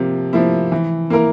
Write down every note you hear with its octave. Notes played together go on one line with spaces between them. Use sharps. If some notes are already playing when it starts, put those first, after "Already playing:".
Already playing: C3 F3 A#3
F3 A#3 E4
E3
A#3 E4 A#4